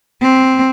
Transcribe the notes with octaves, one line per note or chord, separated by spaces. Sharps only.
C4